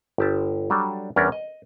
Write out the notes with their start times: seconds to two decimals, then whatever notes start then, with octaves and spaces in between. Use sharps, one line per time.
0.18 G1 G4 A5
0.70 F#3 G3 D4 A4
1.16 E2 G3 C#4 D4 A#4
1.32 D#5